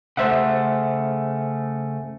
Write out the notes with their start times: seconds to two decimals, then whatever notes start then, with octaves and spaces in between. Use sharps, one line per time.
0.17 C#3 A3 C5 E5 F#5